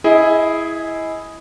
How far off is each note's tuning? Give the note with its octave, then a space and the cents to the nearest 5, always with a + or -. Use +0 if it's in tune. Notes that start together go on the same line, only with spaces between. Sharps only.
E4 +0 G#4 +0 D#5 +30